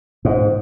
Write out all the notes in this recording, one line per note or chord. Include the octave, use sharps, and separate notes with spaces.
G#2